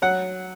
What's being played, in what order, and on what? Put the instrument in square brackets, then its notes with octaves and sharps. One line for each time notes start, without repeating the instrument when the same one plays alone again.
[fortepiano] F#3 F#5